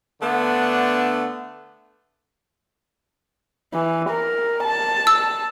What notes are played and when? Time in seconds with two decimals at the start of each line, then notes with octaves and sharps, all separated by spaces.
0.21 D3 A3 B3 D4
3.74 E3
4.09 A#4
4.63 A5
5.07 E6